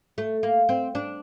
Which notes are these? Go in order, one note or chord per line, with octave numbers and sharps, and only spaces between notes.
A3
A#3
C4
D4